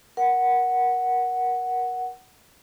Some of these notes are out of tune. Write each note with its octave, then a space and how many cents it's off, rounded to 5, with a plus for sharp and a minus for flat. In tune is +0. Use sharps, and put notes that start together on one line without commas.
A#4 +25 F#5 +0